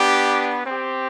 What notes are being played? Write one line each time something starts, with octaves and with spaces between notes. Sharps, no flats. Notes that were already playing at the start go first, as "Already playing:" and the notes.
Already playing: B3 D4 G4
C4 G4